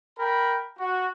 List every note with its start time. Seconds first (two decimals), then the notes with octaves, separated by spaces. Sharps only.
0.19 A#4 G5 B5
0.79 F#4